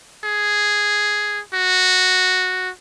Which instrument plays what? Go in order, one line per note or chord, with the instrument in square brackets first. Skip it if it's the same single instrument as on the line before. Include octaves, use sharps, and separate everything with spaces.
[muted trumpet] G#4
F#4